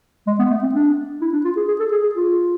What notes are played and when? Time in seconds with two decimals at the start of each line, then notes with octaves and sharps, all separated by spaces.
0.27 G#3
0.39 B3
0.51 A3
0.63 C4
0.75 D4
1.21 E4
1.33 D4
1.45 F4
1.57 G#4
1.68 G#4
1.80 A4
1.92 G#4
2.04 G#4
2.15 F4